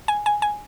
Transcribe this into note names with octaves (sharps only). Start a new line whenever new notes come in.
G#5
G#5
G#5